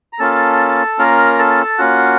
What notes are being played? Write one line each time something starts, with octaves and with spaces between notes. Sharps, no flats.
A#5
A#3 C#4 F4 A4 A5
A#3 C#4 F4 A#4 A#5
A4 A5
A#3 C#4 F4 F#4 F#5